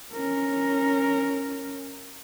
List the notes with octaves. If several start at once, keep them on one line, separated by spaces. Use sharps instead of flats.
C#4 A#4